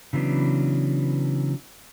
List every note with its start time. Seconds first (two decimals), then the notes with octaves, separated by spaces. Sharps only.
0.13 C#3 E3 F#3 B3 D4